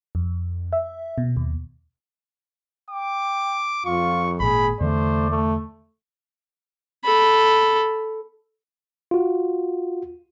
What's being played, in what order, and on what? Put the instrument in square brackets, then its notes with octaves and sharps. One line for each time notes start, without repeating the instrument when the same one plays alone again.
[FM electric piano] F2
E5
B2
D#2
[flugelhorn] G5 [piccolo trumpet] D6
[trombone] F2 [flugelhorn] F4 [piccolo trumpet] C#6
[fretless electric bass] G#1 A#2 [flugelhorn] G#4 [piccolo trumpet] B5
[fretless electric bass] E2 D3 E3 [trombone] A3 [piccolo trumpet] C5 [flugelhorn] D5
[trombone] A3
[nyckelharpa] A4 B5
[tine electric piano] F4 F#4